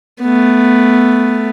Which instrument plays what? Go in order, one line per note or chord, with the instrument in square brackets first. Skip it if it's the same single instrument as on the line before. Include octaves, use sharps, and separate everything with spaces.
[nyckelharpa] A3 B3